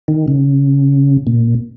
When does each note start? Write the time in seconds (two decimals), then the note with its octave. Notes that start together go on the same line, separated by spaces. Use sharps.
0.08 D#3
0.28 C#3
1.27 A#2